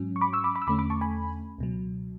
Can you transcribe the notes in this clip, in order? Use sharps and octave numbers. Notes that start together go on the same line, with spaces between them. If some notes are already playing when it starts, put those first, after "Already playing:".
Already playing: G#2 F#3 C#4
C#6
B5 D6
C#6 E6
B5 D6
B5 D6
E6
E2 D3 A3 C#4 B5 D6
B5 D6
A5 C#6
G#5 B5
C#2 B2 F#3